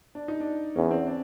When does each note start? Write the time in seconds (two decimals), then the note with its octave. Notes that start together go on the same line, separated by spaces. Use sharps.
0.15 D4
0.28 D#4
0.40 D4
0.76 E2 C#4
0.91 C4
1.06 D4